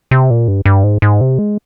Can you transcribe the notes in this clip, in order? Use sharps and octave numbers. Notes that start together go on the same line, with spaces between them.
C3
A#2
G2
G2
G#2
G#2
C3
G#3